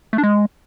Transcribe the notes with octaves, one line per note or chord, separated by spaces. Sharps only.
A3
D4
G#3